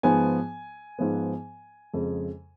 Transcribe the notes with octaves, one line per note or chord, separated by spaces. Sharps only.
G#2 F3 B3 G#5
G#2 F3 B3
F2 C#3 G#3